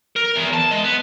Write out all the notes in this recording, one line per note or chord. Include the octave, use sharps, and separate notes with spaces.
A#4
E2
A5
G#3
B3